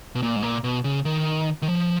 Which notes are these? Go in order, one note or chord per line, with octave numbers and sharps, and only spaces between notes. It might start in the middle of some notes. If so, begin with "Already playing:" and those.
B2
A#2
G#2
A#2
B2
C#3
D#3
D#3
F3